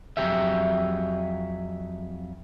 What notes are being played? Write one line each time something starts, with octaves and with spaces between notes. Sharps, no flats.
F2 F#3 G4 G#4 E5